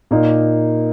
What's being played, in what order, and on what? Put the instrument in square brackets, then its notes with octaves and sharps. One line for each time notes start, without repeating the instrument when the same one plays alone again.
[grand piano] A#2 A#3 D#4